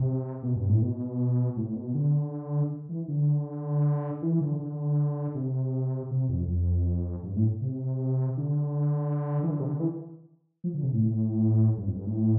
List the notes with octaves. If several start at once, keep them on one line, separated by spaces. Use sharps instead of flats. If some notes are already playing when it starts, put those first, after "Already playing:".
Already playing: C3
B2
G2
A2
B2
A2
B2
D3
E3
D3
E3
D3
D3
C3
C3
F2
F2
G2
A2
C3
D3
E3
D3
C3
D3
E3
F3
D3
C3
A2
G2
F2
G2
A2